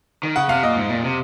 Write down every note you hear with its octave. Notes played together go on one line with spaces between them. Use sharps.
D#3
C#3 F#5
C3 F5
A#2 D#5
G#2
A#2
C3